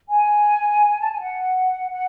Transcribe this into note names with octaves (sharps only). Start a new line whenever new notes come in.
G#5
A5
G#5
F#5
F#5